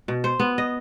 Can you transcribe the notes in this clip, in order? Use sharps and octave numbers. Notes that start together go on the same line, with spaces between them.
B2
C5
B3
D#5